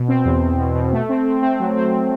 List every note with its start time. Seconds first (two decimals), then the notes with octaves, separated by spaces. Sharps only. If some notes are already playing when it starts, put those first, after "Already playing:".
Already playing: B2
0.08 C4
0.25 E2
0.42 E2
0.59 B2
0.75 B2
0.93 A3
1.09 C4
1.26 C4
1.43 C4
1.60 F#3
1.76 C4